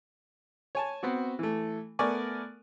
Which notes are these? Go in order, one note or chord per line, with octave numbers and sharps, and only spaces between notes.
C#5 G#5 A5
B3 C4 F#4
E3 A3
A3 B3 A#4 D5 G#5 C#6